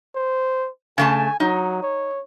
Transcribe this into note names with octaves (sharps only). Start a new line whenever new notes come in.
C5
C#3 A3 G#5 A5
F#3 D#4
C#5